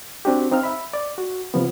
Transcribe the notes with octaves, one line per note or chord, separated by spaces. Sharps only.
C4 D4 F#4 G4
C4 D#4 F5 F6
E5 B5
D5
F#4
C3 F3 B3